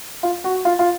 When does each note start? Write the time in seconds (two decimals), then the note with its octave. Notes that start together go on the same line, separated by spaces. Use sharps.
0.23 F4
0.44 F#4
0.65 F4
0.79 F4